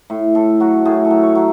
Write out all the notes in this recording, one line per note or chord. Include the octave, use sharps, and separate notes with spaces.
A2
A2 A4
F#3 F#4
A2 G#4
A4
F#3
C#5
F#3